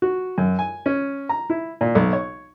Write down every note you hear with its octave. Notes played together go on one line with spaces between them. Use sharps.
F#4
F#2
G#5
C#4
A#5
E4
A#2
B1
C#5